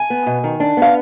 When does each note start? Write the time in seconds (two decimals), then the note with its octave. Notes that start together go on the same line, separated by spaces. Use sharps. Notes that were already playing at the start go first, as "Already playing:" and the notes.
Already playing: G#5
0.10 B3
0.26 B2
0.44 D#3
0.60 D4
0.77 B3 F5